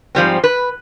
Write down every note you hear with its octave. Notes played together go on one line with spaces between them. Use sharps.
G#2 F3 G3 C4
B4